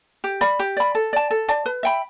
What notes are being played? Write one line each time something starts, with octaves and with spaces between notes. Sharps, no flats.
G4
D5 B5
G4
D5 B5
A4
D5 A5
A4
D5 A5
B4
E5 G5 B5